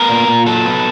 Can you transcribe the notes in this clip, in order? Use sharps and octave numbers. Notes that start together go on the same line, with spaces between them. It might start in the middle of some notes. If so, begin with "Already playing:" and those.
Already playing: B3 A#4
A#2
A#2
F#3 A4
B3